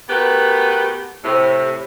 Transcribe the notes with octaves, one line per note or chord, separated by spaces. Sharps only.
A3 B3 F#4 G4 A#4 B4
A2 C3